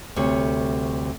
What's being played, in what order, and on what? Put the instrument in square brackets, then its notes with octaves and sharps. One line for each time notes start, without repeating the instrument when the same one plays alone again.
[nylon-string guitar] D2 C3 G3 C#5